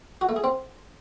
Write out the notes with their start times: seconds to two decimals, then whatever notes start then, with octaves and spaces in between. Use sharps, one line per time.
0.21 F#4
0.29 A3
0.36 G#4
0.44 C4